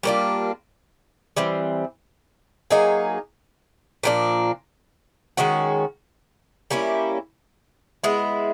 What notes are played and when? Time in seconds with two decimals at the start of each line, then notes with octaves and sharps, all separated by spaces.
0.03 G3 A#3 D4 F4
1.36 E3 G3 C4
2.70 F#3 A#3 D#4 G#4
4.03 A#2 F3 A#3 D4
5.37 D#3 G#3 C#4 F#4
6.71 G3 A#3 C#4 E4
8.04 G#3 B3 E4